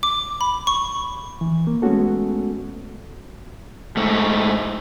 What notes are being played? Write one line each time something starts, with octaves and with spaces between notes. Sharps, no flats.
D6
B5
C#6
E3
A#3
G#3 A3 B3 C#4 F#4 A4
G#2 A3